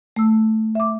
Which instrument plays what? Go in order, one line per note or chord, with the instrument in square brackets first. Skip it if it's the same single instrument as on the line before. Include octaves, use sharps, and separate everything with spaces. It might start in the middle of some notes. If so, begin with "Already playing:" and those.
[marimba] A3 E6
E5 D6